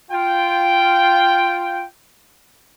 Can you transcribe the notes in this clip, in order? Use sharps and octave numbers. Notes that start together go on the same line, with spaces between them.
F4 G5